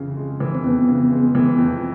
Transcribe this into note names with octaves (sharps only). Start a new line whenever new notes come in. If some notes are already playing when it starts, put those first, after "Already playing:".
Already playing: F2 C#3 E3
G#3
E3
C4
F2 B3
C#3
G#3
E3
F2